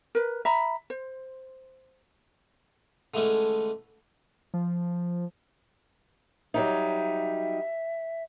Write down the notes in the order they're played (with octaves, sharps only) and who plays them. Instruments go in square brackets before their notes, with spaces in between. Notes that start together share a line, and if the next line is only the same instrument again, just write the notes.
[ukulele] A#4 B4
E5 A#5 B5
C5
[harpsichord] D3 E3 G#3 A3 C#4
[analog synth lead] F3
[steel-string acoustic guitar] F#3 G3 D#4 [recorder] E5